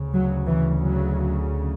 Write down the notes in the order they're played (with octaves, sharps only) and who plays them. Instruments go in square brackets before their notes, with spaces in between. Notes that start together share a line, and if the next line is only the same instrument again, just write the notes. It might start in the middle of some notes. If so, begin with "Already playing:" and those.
Already playing: [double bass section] D2 C#3
F#3
E3
F#3